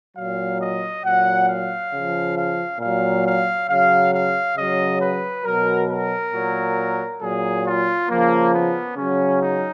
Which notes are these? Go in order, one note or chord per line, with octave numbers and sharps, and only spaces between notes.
A#2 F#3 F5
D#5
A#2 F#3 F#5
F5
C#3 F3
F5
A#2 F#3 F5
F5
C#3 F#3 F5
F5
C#3 F#3 D#5
B4
B2 F#3 A#4
A#4
A#2 F#3
A#2 F#3 G#4
F4
C#3 F3 A#3
B3
C#3 F#3 C#4
D#4